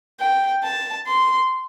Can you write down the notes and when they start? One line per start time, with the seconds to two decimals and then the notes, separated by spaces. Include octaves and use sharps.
0.20 G5
0.63 A5
1.07 C6